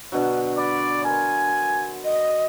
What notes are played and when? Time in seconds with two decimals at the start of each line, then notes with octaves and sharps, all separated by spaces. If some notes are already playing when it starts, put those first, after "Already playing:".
0.12 B2 D3 F#3
0.58 D5 B5
1.05 A#4 C5 G#5
1.48 A5
2.04 D#5